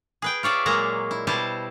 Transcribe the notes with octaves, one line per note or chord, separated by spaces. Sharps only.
G#4 B4 G5
F4 C#5 D5 E5
A#2 F#3 G#3 A#3 G#4 A#5
E4
B2 G3 E4 C5 A5